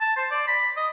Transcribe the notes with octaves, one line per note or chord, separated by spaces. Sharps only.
A5
C5
D5
B5
D#5